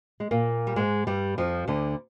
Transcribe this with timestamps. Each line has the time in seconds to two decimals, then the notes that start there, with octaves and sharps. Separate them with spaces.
0.20 G#3
0.31 A#2 A#3
0.67 G3
0.76 G#2 G#3
1.07 G2 G3
1.38 F2 F3
1.68 D2 D3